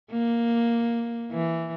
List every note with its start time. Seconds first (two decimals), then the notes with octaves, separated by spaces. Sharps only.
0.11 A#3
1.31 E3